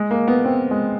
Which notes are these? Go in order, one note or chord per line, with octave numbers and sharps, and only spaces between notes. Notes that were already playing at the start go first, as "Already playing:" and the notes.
Already playing: G#3
A#3
B3
C4
G#3